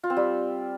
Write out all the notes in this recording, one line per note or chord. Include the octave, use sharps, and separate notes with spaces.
F4
C4
G3